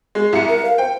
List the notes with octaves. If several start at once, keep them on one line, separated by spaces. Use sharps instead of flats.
G#3
C2 C#7
A#4 C#7
F5
C5 G5